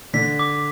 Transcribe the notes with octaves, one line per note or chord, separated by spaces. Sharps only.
D3 D4 B6
D6